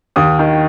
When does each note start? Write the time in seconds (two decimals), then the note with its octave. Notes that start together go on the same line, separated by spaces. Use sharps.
0.16 D#2 D#6
0.39 D#3